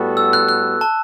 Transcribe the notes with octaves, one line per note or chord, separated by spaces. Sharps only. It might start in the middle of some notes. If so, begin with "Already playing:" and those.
Already playing: A2 G3 B3 F#4 A4
E6
F#6
F#6
A5